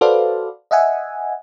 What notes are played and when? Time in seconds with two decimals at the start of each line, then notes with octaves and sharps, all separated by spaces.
0.01 F#4 A4 B4 C5 D5 F5
0.71 D#5 E5 F#5 G#5